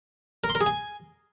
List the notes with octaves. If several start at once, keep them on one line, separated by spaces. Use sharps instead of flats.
A#4
C6
A#4
G#4
G#5